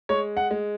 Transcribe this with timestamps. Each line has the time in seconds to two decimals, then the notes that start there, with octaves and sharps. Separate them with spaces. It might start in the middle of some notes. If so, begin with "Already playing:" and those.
0.09 G#3 C#5
0.37 F#5
0.51 G#3